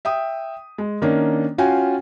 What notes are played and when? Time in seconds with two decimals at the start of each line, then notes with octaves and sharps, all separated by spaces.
0.05 E5 G5 D#6
0.78 G#3
1.02 D#3 A#3 C#4 D4
1.58 C#4 F4 F#4 F5 G5 G#5